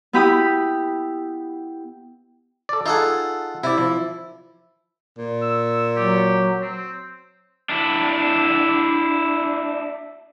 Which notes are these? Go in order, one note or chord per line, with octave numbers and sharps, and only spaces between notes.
B3 E4 G4 B5 D#6
A4 D5
D#4 F4 G#4 A4 F#5
C3 E4 D5
F3
A#2
E6
F#3 G4
C4
D4 E4